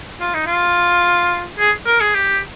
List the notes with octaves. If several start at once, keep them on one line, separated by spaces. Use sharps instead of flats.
F4
D#4
F4
G#4
A#4
G#4
G4